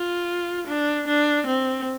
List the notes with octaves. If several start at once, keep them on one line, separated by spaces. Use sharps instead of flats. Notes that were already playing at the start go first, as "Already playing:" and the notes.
Already playing: F4
D4
D4
C4